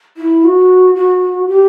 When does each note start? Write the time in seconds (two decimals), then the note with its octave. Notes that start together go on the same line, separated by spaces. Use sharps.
0.17 E4
0.44 F#4
0.95 F#4
1.48 G4